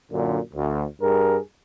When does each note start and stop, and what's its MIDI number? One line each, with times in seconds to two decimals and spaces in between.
0.11 0.38 42
0.11 0.38 46
0.11 0.38 50
0.54 0.85 38
1.02 1.39 43
1.02 1.39 68
1.02 1.39 70